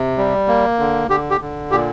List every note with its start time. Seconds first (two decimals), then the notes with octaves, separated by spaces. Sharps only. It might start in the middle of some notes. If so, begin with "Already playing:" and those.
Already playing: C3
0.17 G3
0.48 A#3
0.79 D3
1.09 D3 G4
1.31 G4
1.41 D3
1.71 A#2 G4